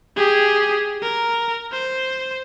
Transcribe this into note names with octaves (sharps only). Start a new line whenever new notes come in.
G4 G#4
A#4
C5